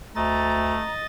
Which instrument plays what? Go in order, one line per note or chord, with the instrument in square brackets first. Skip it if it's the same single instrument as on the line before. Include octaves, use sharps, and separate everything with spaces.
[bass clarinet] D2 [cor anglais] A3 [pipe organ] D#5 A6 [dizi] A#5